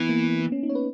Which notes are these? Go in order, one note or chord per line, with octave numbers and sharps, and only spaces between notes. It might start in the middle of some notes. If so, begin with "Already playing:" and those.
Already playing: E3 B3
A#3
A#3
B3
C#4
D#4
C#5
B4